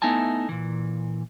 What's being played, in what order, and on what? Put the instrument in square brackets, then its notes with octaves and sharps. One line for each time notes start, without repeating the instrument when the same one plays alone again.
[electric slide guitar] A3 B3 D#4 E4 G#5 A5
A#2 E3